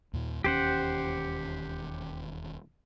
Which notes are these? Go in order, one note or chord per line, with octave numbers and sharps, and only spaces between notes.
D#2 A#2
E1 D#2 C#4 G4 C5 F#5